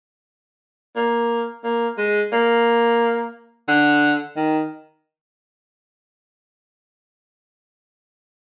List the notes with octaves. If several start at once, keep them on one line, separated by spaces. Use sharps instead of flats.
A#3
A#3
G#3
A#3
D3
D#3